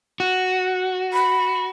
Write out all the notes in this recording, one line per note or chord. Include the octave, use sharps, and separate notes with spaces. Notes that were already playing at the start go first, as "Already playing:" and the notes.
F#4
B5